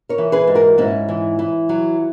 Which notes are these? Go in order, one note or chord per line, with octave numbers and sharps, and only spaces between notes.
A#4 C#5
E3
G#4 B4
G#2
F#4 A#4
G#2 C#4 E4
E3
E3
F#3